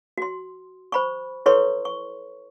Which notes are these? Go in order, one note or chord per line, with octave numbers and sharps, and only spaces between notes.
F#4 C6
C5 B5 C#6
E4 A4 B4 C#5 C6 C#6
C#6